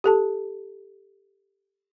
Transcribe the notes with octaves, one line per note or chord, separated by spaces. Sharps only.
G4 A4 A5